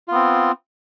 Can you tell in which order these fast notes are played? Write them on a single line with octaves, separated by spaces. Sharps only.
F4 B3 C4